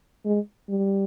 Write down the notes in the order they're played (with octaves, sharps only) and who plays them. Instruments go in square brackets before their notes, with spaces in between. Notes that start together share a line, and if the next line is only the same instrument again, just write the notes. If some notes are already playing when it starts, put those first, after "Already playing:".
[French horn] G#3
G3